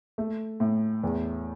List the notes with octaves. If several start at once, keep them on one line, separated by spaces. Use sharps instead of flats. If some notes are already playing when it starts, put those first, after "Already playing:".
A3
A2
E2